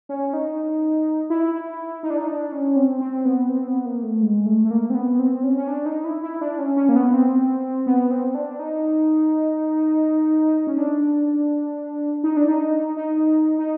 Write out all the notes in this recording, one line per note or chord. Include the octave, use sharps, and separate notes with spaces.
C#4
D#4
E4
D#4
D4
D#4
D4
C#4
C4
C4
B3
C4
B3
A#3
A3
G#3
A3
A3
A#3
C4
B3
C4
C#4
C#4
D4
D#4
E4
E4
D4
C#4
C#4
A#3
B3
C4
B3
C4
D4
D#4
C#4
D4
D#4
D4
D#4
D#4
D#4